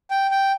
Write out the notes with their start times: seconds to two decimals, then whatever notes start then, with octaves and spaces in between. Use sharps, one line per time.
0.11 G5
0.31 G5